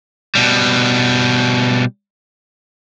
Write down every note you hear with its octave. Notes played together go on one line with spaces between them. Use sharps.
B2 G3